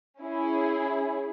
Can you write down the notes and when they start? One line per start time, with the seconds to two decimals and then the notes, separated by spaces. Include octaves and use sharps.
0.20 C#4 E4 G#4